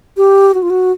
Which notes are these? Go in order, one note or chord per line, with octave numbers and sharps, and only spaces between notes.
G4
F#4
F4
F#4